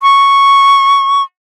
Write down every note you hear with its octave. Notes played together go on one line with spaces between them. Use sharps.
C#6